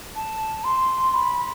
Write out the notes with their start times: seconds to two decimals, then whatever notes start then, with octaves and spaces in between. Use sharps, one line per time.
0.15 A5
0.64 C6
1.14 B5
1.38 B5